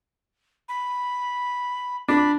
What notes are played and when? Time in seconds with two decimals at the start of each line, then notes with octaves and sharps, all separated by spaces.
0.69 B5
2.08 D4 B5